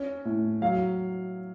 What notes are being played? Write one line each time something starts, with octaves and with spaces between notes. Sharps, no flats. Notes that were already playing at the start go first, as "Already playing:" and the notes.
Already playing: C#4
A2
F#3 F5